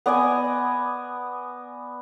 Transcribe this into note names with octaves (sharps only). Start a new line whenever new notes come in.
B3 D5 D#5 G#5